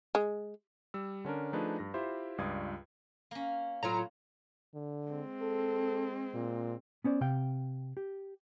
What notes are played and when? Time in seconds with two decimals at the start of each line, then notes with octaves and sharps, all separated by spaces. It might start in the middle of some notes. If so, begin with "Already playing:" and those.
0.15 G#3
0.94 G3 E6
1.25 D3 C#4 D4 A#4
1.53 F3 A3 D4 D#4 G#4 B4
1.79 G2 A#6
1.94 E4 F4 G4 C5 E5
2.38 C#2 G2 F4 D5 D#6 G#6
3.31 A#3 C#4
3.83 A2 F#3 F4 A#5
4.74 D3
5.07 G#3 C4
5.42 A4
6.34 A#2
7.04 B3 C#4 C5 D5
7.21 C3 F5 G5
7.97 G4